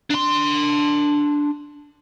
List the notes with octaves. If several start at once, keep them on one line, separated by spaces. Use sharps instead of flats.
D4 C6